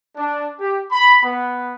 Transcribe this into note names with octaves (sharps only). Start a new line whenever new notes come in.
D4
G4
B5
B3